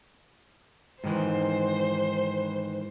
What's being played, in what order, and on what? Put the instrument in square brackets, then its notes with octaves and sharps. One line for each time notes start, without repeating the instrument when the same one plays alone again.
[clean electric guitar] G#2 D#3 E3 [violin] C5